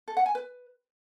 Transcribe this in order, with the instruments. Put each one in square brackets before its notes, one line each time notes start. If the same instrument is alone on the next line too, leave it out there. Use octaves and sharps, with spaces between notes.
[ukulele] A4
F#5
G#5
B4